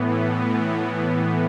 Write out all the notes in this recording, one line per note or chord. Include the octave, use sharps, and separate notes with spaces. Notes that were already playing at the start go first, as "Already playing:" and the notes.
Already playing: A2 E3 B3